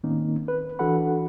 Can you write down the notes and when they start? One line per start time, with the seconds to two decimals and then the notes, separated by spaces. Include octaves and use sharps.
0.04 A2 D#3 A#3 C4 C#4 D#4
0.48 B4
0.79 E3 D4 F#4 A4 F#5 B5